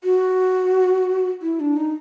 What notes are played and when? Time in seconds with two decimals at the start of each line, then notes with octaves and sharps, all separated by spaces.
0.04 F#4
1.42 E4
1.60 D4
1.77 D#4